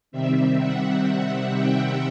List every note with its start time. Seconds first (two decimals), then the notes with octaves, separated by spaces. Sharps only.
0.12 C3 D#3 G3 C4 E5
0.59 F#5
1.06 F#5
1.53 G5